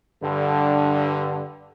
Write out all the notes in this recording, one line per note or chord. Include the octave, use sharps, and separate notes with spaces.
G2 D3